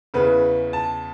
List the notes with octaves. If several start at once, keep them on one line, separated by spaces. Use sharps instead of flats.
E2 C#3 E3 B4
A5